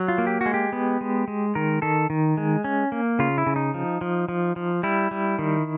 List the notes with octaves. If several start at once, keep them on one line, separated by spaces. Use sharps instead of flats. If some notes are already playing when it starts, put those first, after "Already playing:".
Already playing: F#3
F4
A#3
G4
G#3 F#4
G4
B3
G#3
G#3
D#3 A#4
D#3 A4
D#3
G#3
C#4
A#3
C#3 F4
E4
C#3
D#4
F3
F3
F3
F3
G3 E4
G3
D#3